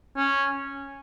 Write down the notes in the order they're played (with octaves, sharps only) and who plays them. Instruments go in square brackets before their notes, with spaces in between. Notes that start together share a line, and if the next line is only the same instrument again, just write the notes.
[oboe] C#4